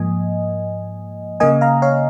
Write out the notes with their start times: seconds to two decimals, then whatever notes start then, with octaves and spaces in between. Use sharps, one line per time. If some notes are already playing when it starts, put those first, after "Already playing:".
Already playing: G#2 F3 A#3 D#5 G#5
1.40 C#3 A#3 D#5 G#5
1.61 F5 A#5
1.82 C#5 F5